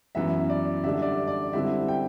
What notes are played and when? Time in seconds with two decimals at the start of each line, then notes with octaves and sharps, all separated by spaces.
0.15 F#2 E3 B3 E5
0.50 D5
0.84 D3 G3 D4 E5
1.02 D5
1.27 D5
1.53 D3 G3 C4 E4 E5
1.88 G5